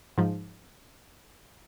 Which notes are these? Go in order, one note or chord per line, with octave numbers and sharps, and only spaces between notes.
G#2 F3